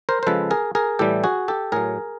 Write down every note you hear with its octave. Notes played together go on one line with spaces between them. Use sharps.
A#4 C5
C5
C#3 F3 G#3 A4 B4
G#4 A#4
G#4 A#4
A2 E3 G3 G4 A4
F#4 G#4
G4 A4
A2 F#3 G#4 A#4